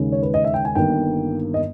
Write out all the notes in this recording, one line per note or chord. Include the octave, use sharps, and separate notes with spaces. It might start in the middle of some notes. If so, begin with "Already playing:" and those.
Already playing: D#2 C#3 G#3
C#5
B4
D#5
E5
G5
G#5
G1 G2 D#3 A#3 G5
D#5